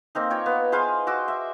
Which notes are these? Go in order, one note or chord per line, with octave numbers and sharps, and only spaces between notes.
A#3 C4 D#4
F4 C#5 G5
B3
G#4 B4 C5 F5
F#4 C6 D6 E6
E5